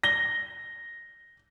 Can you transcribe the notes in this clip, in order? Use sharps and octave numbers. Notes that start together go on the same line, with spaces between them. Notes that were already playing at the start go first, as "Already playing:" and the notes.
A#6 G7